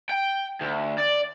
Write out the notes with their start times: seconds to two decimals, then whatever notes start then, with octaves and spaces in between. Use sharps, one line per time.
0.09 G5
0.61 D2
0.98 D5